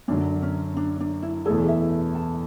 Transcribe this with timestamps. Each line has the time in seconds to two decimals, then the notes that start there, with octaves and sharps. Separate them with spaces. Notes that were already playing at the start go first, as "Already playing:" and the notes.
0.08 F#2 D3 F#3 D4
0.42 C#4
0.77 D4
1.00 D4
1.22 E4
1.45 E2 B2 A3 E4 G#4 A4
1.68 E5
2.15 A5